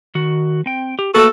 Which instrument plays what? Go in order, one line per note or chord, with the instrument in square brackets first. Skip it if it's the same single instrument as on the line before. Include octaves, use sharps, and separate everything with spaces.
[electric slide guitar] D#3 F#4
C4 G5
G4
[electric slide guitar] A3 A#3 B4 [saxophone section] F#4 A4